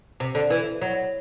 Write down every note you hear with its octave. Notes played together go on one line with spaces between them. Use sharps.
C3
D3
E3
F#3